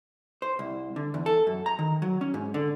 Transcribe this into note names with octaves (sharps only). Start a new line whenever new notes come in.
C5
C2
D3
E2
A4
F#2
A#5
D#3
F#3
C#4
G#2
D3